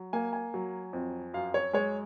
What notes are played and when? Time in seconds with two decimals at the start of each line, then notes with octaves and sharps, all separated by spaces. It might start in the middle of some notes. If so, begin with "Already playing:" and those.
Already playing: F#3
0.13 A#3 G#5
0.33 G#5
0.54 F#3
0.93 F2
1.33 F#2 F5
1.54 C#5
1.73 G#3 C#5